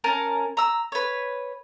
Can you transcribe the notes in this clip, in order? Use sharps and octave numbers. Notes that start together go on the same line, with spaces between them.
C#4 A#4 A5
A#5 E6
B4 C#5